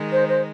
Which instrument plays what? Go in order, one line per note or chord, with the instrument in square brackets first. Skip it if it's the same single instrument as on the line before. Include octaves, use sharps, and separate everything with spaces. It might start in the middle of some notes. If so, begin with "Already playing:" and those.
Already playing: [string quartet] D#3 G#3 D#4
[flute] C5
C5